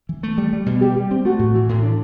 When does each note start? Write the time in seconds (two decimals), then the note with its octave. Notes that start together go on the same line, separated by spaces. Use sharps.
0.09 E3
0.23 A3
0.38 G3
0.53 G3
0.66 B2
0.81 G3 G4
0.96 G3
1.11 C4
1.25 A3 F#4
1.39 A2
1.55 E3
1.69 A2
1.83 D4